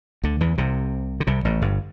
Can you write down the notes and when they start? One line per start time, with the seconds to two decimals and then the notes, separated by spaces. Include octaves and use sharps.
0.24 D2 D3
0.41 E2 E3
0.58 C2 C3
1.20 D3
1.27 C2 C3
1.45 A1 A2
1.62 G1 G2